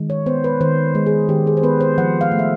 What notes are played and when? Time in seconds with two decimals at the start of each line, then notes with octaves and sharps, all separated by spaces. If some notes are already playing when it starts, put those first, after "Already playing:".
Already playing: D#3 G#3
0.10 C#5
0.26 B3 C5
0.44 B4
0.61 D#3 C5
0.95 G#3
1.06 G#4
1.29 D#3 G4
1.47 G#4
1.57 C5
1.63 B3 B4
1.81 C5
1.98 F3 F#5
2.21 F5
2.32 A3
2.39 E5